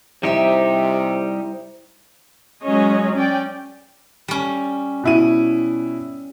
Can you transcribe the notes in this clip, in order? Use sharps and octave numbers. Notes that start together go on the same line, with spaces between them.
C3 G3 D#4 E4 G4 C5 E5
F#3 G#3 C#4 G#4 C#5 D#5
C#4 D5 G5
G3 C#4
B2 E4 D#7